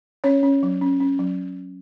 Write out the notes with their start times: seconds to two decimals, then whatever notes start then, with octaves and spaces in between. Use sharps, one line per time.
0.24 C#4 C#5
0.43 C#4
0.63 F#3
0.81 C#4
1.00 C#4
1.19 F#3